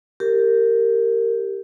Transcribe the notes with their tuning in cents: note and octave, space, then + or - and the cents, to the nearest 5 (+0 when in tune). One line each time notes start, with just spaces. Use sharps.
G4 +0 A#4 -20